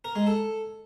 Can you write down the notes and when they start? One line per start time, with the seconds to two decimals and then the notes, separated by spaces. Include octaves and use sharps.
0.05 A#4
0.16 G#3
0.27 A4